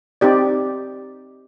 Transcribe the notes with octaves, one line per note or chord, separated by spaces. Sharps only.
C4 D#4 G4 D5